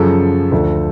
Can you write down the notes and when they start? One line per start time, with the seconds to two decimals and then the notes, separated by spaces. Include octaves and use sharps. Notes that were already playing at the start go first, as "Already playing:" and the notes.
Already playing: F#2 C#3 F3 A4
0.52 D2 D3 F3 A3